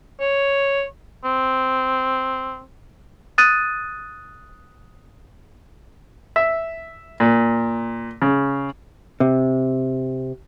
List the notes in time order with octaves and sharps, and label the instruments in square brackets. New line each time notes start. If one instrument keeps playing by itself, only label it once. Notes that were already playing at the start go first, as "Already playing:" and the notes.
[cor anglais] C#5
C4
[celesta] D#6 F#6 A6 D#7
[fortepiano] E5
A#2
C#3
[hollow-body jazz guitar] C3